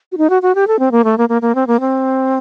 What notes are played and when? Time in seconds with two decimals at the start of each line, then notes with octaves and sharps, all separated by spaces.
0.12 F#4
0.18 D#4
0.30 F#4
0.42 F#4
0.55 G4
0.67 A4
0.79 C4
0.92 A#3
1.04 A3
1.18 A#3
1.29 A#3
1.42 A#3
1.55 C4
1.67 A#3
1.80 C4